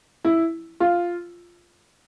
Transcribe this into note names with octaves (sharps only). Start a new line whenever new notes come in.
E4
F4